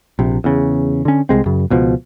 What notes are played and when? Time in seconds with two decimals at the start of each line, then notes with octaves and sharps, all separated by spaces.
0.19 A#1 C3
0.44 E2 C#3
1.05 D3 C#4
1.29 C2 G#3 C4
1.46 F#2 C#3
1.70 C#2 B2 F3